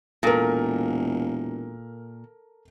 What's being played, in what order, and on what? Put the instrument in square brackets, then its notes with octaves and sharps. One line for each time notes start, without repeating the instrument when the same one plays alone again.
[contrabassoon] E1 [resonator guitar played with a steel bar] A#2 [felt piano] A4 A#4